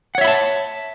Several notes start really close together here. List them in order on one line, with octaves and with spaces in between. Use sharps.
F#5 C#5 E5 B5 A5